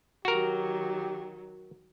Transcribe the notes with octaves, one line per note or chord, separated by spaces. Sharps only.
D#3 F#3 F#4 G4 A#4